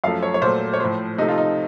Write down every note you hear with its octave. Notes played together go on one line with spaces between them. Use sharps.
F#2 F3 A3 F5
C#5
C#5
A#2 F#3 A3 C5
C#5
A2 F3 A3 C5
C3 F3 A3 D#4
F4
D#4